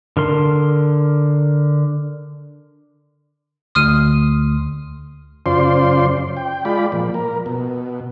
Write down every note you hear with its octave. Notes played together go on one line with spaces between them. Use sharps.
D3 A#4 C6
D2 C6 D#6 F6 D#7
F#2 C#3 F4 C5 D5 C6
G5
G#3 F4 D5 B5
A#2 F3
A#4
B2